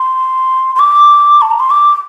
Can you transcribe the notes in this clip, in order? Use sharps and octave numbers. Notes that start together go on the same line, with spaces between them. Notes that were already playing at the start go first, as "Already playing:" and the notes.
Already playing: C6
C6
D6
A5
A#5
C6
D6